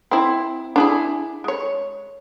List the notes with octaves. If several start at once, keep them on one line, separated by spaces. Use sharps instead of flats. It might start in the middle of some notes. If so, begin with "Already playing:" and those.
C4 E4
D4 E4 G#4
G#3 C#5